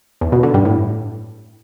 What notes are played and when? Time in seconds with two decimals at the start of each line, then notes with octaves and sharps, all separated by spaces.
0.21 E2
0.32 B2
0.43 D3
0.54 G2
0.65 A2